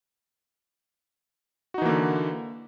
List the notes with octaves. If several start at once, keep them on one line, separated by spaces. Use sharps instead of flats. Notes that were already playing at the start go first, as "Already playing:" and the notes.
D3 E3 A#3 D#4 F#4